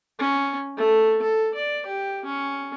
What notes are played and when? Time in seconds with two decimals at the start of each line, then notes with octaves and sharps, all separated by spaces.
0.19 C#4
0.77 A3
1.22 A4
1.54 D5
1.86 G4
2.25 C#4